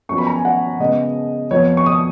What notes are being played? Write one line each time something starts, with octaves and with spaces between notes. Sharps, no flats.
F#2 F3 B3 C#6
B5
A#5
G#5
F#5
C#3 G#3 B3 D#5
F2 F3 B3 C#5
C#6
D#6